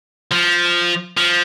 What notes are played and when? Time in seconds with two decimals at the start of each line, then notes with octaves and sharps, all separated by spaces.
0.31 F3
1.17 F3